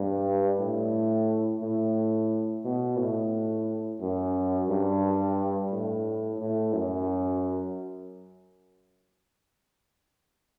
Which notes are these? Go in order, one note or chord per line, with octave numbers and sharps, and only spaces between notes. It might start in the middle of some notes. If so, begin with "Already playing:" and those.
Already playing: G2
A2
A2
B2
A2
F#2
G2
A2
A2
F#2